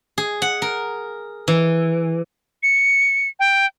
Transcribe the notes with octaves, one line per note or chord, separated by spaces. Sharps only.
G#4
F#5
A#4
E3
C#7
G5